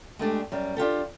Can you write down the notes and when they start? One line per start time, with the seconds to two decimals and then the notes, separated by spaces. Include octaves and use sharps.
0.19 G#3 A3 D4 G4
0.52 F#2 G3
0.77 D4 F4 G4 A4